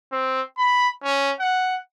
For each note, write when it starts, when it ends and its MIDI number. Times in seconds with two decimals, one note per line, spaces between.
0.12 0.42 60
0.57 0.88 83
1.03 1.31 61
1.40 1.76 78